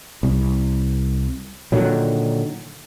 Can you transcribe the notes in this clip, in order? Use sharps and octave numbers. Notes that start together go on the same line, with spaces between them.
C2
A#2 D3 D#3 F#3